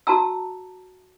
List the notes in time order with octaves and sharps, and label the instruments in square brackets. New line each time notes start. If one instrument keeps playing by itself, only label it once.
[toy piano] F#4 A5 A#5 E6